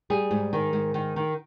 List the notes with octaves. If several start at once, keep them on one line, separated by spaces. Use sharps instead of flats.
G3 G#4
G#2
D#3
G#2
D#3
D#3